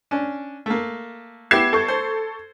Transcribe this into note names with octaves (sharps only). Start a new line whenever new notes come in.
C#4 D4
A3 A#3
B3 E4 G4 G#6 C7 E7
A4 C#6 G6
C5